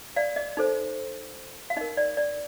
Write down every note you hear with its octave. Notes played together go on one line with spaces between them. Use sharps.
D5 F5
D#5
D#4 A4 C5
F5
D#4 A#4 D#5
D5
D5